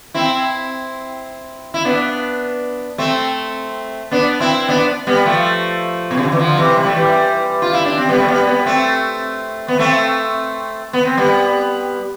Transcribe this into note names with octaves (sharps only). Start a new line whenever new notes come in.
C4 E4
E4
B3 D4
A3 C4
B3 D4
C4 E4
B3 D4
G3 B3
F3 A3
B2
C3
D3
E3
D3 F3
C3 E3
G3
A3
E3 G3
F4
E4
D4
C4
G3 B3
A3
G3 B3
G3 B3
A3 C4
B3
A3 C4
B3
C4
G3 B3